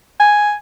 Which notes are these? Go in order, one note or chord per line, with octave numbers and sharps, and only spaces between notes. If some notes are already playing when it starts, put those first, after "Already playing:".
G#5